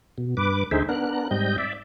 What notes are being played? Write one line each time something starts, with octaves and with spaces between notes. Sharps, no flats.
B2
G2 B4 D6
D2 D3 D#4 G#4 C5 E5
B3 D4 A#4 F#6
G#2 G3 C4 D#5 G6
D5 E5